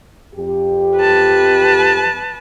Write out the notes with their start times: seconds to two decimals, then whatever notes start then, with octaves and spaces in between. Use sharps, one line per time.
0.35 F2 G4
0.97 B4 A5